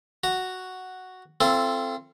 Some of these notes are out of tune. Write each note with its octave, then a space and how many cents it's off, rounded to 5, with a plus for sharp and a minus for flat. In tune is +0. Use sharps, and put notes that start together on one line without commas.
F#4 +0 A#5 -10
C4 +0 F4 -35 A4 +0